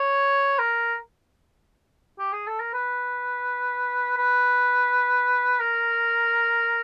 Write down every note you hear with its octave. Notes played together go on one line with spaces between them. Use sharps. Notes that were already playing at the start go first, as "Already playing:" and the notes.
Already playing: C#5
A#4
G4
G#4
A4
A#4
B4
B4
A#4